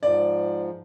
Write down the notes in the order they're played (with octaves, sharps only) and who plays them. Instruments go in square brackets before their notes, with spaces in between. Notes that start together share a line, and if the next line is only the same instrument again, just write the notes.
[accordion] G#2 F3 [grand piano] D5